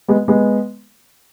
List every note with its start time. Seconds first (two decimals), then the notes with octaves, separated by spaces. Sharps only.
0.08 G#3 B3
0.28 G#3 B3